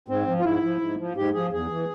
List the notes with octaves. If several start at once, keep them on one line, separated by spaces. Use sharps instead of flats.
G#2 C4
F3
F4
G#2 E4
F3
G#2
F3
G#2 G4
F3 G#4
E2 G#4
E3